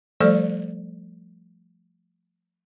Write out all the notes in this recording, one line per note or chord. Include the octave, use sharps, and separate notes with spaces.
F3 G3 A3 A4 C5 D5